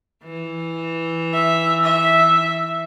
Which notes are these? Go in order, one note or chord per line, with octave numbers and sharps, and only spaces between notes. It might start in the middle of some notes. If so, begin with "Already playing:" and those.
E3
E5
E5